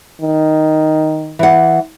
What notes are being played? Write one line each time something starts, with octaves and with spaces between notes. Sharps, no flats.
D#3
E3 F#5